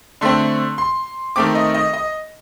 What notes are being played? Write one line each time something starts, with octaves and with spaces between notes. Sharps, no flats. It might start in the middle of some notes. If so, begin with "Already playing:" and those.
D3 A3 C4 C6
C6
D#3 A3 C4 D6
D#5
D#5
D#5